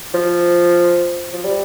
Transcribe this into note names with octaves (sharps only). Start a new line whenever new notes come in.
F3
F3
G3